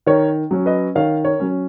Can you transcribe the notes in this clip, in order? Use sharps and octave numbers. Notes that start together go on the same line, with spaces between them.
D#3 A#4 C#5
F#3 C#4
B4 D#5
D#3 C#5 F5
A#4 C#5
F#3 C#4